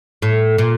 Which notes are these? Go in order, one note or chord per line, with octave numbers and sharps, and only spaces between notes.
A2
A#2